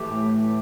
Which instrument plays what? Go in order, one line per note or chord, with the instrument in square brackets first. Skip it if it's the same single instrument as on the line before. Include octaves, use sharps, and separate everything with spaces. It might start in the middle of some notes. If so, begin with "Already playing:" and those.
Already playing: [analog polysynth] E3 A3 [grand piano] G4
[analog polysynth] A2